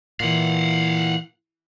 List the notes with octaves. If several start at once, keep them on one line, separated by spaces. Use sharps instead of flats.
A#2 E3 F5 F#5